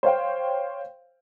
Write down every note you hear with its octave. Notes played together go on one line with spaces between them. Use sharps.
C5 C#5 F5 G5